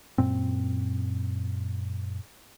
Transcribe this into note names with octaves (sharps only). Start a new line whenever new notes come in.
F#2 A#2 C4